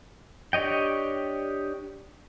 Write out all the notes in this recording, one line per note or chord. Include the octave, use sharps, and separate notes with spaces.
D4 G4 C#5 D#5 G5